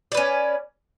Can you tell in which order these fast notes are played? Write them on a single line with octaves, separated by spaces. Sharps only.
D5 B4 C#4